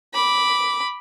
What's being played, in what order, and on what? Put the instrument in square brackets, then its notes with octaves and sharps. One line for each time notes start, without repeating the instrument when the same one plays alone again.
[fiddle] B5 D6